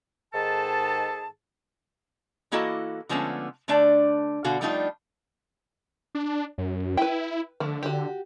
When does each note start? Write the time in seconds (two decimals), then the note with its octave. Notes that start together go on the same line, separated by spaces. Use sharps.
0.33 G#2 D#3 G#4 A4 A5
2.52 E3 A#3 E4 F#4 A4 D#5
3.09 D3 F3 G#3 A3 B3 C#4
3.68 D3 A3 D4 D5
4.44 B2 D3 F#4 F5
4.61 F3 G3 A3 D4 D#4 F4
6.15 D4
6.58 F#2
6.97 E4 B4 G5
7.60 D3 F3 A3
7.83 F#4 G4